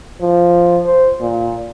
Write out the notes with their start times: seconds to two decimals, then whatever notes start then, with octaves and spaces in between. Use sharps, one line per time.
0.21 F3
0.85 C5
1.21 A#2